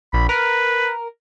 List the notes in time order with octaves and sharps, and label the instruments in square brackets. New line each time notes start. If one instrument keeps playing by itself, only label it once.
[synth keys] A#1 [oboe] B5
[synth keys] A#4 [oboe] B4